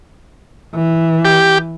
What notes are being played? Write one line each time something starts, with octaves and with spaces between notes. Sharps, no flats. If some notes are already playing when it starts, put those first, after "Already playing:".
E3
G4